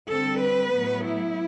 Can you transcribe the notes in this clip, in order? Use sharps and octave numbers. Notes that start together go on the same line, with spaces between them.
D3 G3 C4 A4
B4
A2 F#3 B3
E4